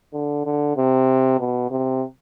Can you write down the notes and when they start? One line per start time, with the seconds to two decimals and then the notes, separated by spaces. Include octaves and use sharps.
0.13 D3
0.45 D3
0.77 C3
1.39 B2
1.71 C3